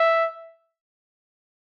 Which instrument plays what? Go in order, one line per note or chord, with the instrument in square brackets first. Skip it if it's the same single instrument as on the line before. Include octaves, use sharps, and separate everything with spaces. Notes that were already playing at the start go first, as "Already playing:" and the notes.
Already playing: [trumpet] E5